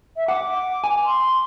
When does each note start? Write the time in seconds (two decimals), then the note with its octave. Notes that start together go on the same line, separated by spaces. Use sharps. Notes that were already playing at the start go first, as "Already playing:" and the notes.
0.16 E5
0.28 F#5 D6
0.84 G#5
1.05 C6